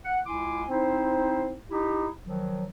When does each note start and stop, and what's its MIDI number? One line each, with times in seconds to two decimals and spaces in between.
0.05 0.18 78
0.26 0.63 37
0.26 0.63 64
0.26 0.63 80
0.26 0.63 84
0.26 0.63 86
0.69 1.53 60
0.69 1.53 63
0.69 1.53 64
0.69 1.53 72
1.70 2.07 63
1.70 2.07 64
1.70 2.07 67
2.25 2.65 51
2.25 2.65 53
2.25 2.65 54